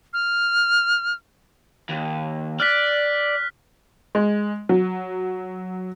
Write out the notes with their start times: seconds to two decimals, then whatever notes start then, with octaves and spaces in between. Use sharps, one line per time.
0.13 F6
1.90 D#2
2.60 D5 F6 F#6 B6
4.15 G#3
4.69 F#3